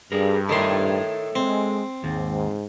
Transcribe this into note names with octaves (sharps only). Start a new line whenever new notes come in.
G2 G#4 A#4
D#3 A4 C#5 E5 C6
G#3 C4
D#2 G#2